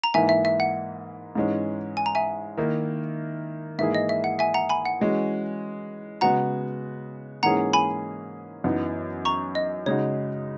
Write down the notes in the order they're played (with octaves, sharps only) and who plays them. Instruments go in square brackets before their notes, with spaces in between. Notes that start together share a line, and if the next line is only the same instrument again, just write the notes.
[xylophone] A#5
[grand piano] G#2 E3 A#3 [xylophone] E5 G#5
[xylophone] E5
E5
F#5
[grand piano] G#2 E3 G#3 C#4
[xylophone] G#5
A#5
E5 G#5
[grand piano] D#3 A#3 E4
[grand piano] G#2 E3 A#3 E4 G#4 [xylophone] E5
[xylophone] D#5
E5
F#5
E5 G#5
F#5 A#5
G#5 B5
F#5
[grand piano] E3 G#3 C#4 F#4
[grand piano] C#3 G#3 B3 F#4 [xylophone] F#5 A#5
[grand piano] G#2 E3 A#3 C#4 G#4 [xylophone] F#5 A#5
[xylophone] G#5 B5
[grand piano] F#2 E3 B3 D#4
[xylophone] A#5 C#6
D#5
[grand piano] C#3 G#3 D#4 F#4 [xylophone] C#5